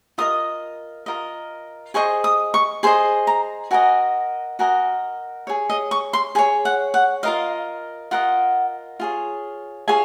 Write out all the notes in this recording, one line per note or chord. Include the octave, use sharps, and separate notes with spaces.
F4 A#4 D#5 D#6
F4 A#4 D#5
G#4 C5 D#5 C#6
D#6
C#6
G#4 C5 D#5 C6
A#5
F#4 A#4 D#5 G#5
F#4 A#4 D#5 G#5
G#4 C#5
D#5
C#6
C6
G#4 C#5 G#5
F#5
F#5
F4 A#4 D#5 F5
F4 A#4 D#5 F#5
F4 G#4 C#5
F4 G#4 C#5 G#5